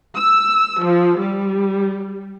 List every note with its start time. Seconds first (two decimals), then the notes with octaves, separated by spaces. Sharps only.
0.15 E6
0.83 F3
1.20 G3